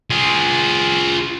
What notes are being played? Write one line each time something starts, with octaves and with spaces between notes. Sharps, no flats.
F4 G#4